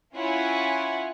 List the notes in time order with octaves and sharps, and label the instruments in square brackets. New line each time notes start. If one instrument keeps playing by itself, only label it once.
[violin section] C#4 E4 F4 C#5 F#5 G#5